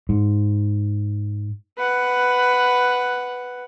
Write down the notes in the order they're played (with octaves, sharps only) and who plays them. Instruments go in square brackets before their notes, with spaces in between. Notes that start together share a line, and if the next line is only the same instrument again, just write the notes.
[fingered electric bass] G#2
[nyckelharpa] B4 F#5